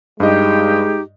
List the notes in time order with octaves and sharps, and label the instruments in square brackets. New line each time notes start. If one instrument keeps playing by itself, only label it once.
[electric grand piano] G2 D#5 [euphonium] G#3 [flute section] D#4 G4